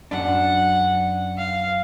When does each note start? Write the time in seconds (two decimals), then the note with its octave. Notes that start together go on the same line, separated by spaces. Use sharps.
0.11 F#2 D4 F#5
1.37 F5